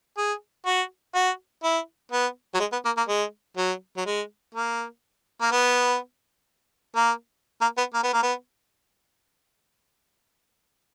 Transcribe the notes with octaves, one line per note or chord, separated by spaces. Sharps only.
G#4
F#4
F#4
E4
B3
F#3
G#3
B3
A#3
A#3
G#3
F#3
F#3
G#3
A#3
A#3
B3
A#3
A#3
B3
A#3
B3
A#3
B3